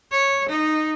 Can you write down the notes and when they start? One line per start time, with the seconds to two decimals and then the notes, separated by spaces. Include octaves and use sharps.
0.11 C#5
0.49 D#4